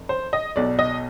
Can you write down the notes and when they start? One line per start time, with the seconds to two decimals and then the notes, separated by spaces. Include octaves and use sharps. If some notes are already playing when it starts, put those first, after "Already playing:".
Already playing: F1
0.09 C5
0.33 D#5
0.56 B1 B2 D5
0.79 D#5